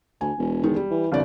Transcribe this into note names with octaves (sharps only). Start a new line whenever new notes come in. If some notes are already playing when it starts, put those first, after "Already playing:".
D2 G#5
E1
D#3 G#3
G3
E3
G1 C2 D5